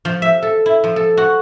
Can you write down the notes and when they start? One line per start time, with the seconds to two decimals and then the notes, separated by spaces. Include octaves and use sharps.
0.05 F3
0.22 E5
0.43 A4
0.66 E4
0.84 F3
0.96 A4
1.17 F#4